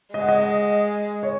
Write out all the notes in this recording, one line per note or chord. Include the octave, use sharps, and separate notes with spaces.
G#3 D#5
F#5
D#5
C#5